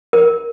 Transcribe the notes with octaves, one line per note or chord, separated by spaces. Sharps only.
A#4